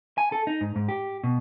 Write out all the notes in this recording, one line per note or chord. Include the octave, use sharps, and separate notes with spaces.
G#5
A4
D#4
G#2
G#2
G4
B2